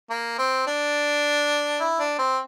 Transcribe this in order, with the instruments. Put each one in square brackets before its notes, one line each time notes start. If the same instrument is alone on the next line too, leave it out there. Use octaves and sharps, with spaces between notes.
[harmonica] A#3
C4
D4
E4
D4
C4